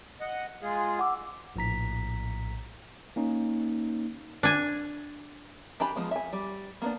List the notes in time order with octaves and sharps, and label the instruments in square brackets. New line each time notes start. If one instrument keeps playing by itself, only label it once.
[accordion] D#5 F#5
G#3 F4 G#4
[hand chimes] F#5 D6 E6
[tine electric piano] A#1 A2 A#5 B6
A#3 C#4 D#4
[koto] D4 G#5
[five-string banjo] D4 G4 G#5 B5
F3 G#3 B3
E5 G#5
G3
A#3 B3 D4